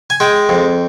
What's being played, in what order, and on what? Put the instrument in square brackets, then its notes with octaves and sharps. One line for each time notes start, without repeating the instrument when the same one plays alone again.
[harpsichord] G#5
G#3 G5
F2